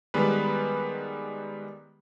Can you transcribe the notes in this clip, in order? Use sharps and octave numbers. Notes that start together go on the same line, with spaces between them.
D#3 G3 G#3 B3 B4